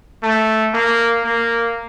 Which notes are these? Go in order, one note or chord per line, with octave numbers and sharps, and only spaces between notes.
A3
A#3
A#3